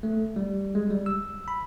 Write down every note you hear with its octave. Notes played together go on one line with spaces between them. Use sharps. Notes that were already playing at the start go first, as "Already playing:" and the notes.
A3
G3
G#3
G3
E6
B5